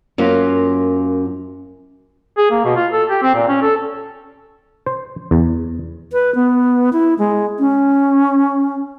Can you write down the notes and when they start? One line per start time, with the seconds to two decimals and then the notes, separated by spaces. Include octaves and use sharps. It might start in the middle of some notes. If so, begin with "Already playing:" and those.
0.18 F#2 A#3 C#4 F4
2.38 G#4
2.51 A#3
2.64 B2
2.76 F4
2.92 A4
3.10 G4
3.22 C4
3.35 A#2
3.49 C#4
3.62 A4
4.86 C5
5.31 E2
6.13 B4
6.35 B3
6.93 E4
7.19 G#3
7.59 C#4